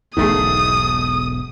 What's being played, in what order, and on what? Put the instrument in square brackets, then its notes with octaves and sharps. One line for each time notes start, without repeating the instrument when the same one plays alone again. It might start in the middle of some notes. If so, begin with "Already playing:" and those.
[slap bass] E1 B1 G#2 [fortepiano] D#3 A3 G#4 [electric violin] D#6